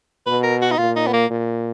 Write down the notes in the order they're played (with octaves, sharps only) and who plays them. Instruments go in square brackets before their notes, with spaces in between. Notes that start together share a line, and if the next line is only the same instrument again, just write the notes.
[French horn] B2 [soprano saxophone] B4
[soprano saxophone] A#4
F#4
D#4
[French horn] A#2 [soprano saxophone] F4
[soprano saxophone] D#4
B3
A#3
[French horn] A#2